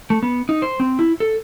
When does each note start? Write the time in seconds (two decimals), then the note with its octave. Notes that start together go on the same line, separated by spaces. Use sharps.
0.10 A3
0.23 B3
0.49 D#4
0.62 C5
0.80 C4
0.99 E4
1.20 A4